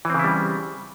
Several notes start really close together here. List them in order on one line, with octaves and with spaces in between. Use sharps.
E3 C4 C#3 E4 G3